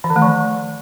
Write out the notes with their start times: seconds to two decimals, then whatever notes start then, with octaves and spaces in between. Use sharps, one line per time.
0.04 E3
0.10 D#3
0.16 A3
0.22 F3